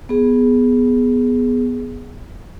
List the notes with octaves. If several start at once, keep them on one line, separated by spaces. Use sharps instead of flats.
B3 G#4